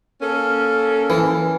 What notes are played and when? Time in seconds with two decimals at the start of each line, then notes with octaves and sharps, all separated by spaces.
0.22 A#3 C#4 A4
1.10 E3